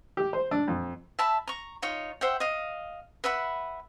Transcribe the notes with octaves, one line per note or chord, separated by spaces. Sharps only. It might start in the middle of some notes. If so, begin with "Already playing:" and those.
G4
C5
D4
F2
E5 A5 B5
A#5 C#6
D#4 F4 C#5
C5 E5 F#5 G5
D#5 F5
B4 E5 F#5 B5